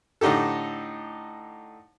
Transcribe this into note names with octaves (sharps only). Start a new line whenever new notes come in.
A2 D3 D#4 G4 A4